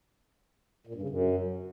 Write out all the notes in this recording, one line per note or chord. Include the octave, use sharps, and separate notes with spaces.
A#2
G2
C#3
F#2